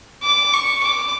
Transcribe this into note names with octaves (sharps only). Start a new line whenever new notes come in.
D6
C#6
D6